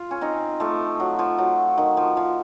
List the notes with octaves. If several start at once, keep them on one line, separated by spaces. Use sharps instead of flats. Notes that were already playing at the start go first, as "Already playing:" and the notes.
Already playing: F4
C#4
C4 D#4
F3 A3
F#3
F3
F#3
D#3
F3
F3